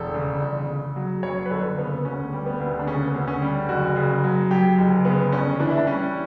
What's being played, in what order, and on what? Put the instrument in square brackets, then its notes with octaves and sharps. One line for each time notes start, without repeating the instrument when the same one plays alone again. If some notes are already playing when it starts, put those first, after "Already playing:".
Already playing: [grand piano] E1 A4
C#3
G1
C#3
F#3
F#2 C#5
B4
G1 A4
C#3 B3
B3
D2 C#4
G3
B3
D2
D4
C#3 C#4
B3
D2
C#4
G3
F#1 F#4
C#3
F#3
F#2 G4
F#1
C#3 B3
G1 C#4
E3 D4
E4
D4
G3 C#4